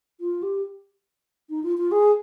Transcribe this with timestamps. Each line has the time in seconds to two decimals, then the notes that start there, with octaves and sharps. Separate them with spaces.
0.21 F4
0.43 G4
1.50 D#4
1.63 F4
1.78 F4
1.92 G#4